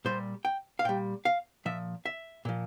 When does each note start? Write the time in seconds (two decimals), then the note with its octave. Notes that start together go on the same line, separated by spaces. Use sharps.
0.05 A#2 G3 C5
0.45 G5
0.79 F5
0.84 A#2 G3 G5
1.25 F5
1.65 A#2 F3 E5
2.06 E5
2.45 A#2 F3